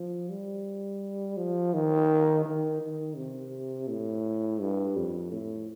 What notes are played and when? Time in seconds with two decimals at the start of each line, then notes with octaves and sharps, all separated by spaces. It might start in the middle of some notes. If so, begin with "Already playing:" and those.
Already playing: F3
0.30 G3
1.37 F3
1.74 D#3
2.45 D#3
2.81 D#3
3.17 C3
3.88 A2
4.61 G2
4.97 F2
5.32 A2